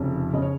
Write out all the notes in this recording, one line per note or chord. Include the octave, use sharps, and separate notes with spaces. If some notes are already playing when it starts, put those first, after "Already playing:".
Already playing: F1 F2 C#3
C#3 D#5
C#5